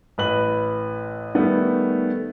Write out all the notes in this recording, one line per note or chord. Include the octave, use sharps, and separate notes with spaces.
A1 B4 F#7
D#3 G3 A3 B3